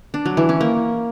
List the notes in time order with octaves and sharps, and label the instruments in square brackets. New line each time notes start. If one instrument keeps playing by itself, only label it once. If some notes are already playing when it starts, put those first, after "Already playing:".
[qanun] D4
F#3
E3
C#4
A#3